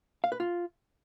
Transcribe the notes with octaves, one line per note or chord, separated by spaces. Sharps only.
F5
B4
F4